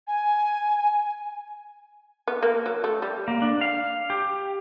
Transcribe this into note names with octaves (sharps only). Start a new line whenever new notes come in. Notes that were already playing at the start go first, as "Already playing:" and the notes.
G#5
B3
A#3
F#3
A3
G3
A#3
D4
F5
G4